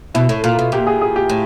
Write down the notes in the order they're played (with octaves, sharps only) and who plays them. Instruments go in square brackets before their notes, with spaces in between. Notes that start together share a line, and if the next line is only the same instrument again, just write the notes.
[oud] B2 [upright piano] E4
[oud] A2
[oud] A#2 [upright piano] F4
[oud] B2
[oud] A#2 [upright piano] G4
[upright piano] G#4
G#4
G4
[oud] A2